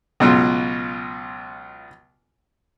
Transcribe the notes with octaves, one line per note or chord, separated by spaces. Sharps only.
C#2 B2 F#3 F4